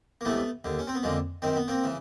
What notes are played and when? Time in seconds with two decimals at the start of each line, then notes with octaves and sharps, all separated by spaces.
0.21 A#3
0.25 C#2 C3 E3 A3 B3
0.64 D#2 D3
0.79 C#4
0.87 C4
0.95 B3
1.03 F2 D3 G#3 A#3
1.42 F#2 D#3 C4
1.56 B3
1.68 A#3 C4
1.84 C#3 E3